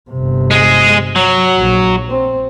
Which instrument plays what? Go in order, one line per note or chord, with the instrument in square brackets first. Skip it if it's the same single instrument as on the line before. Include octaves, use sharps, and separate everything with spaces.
[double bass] G1 C3
[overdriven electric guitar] G#3 G#4
F#3
[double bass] A#1
C4